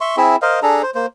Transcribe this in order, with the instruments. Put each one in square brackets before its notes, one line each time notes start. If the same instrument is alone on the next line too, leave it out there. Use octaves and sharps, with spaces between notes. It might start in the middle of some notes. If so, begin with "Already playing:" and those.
[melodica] E5 C6 C#6
C4 E4 G#4 E5
A#4 C5 D#5 F5
D4 G#4 A4 A#5
C5
A#3 C5